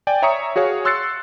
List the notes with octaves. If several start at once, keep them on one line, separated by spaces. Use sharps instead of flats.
D5 G5 G#5
C#5 E5 A#5 C#6 D#6 C#7
F#4 G#4 C#5 F5
C6 E6 F#6 A6 C7 C#7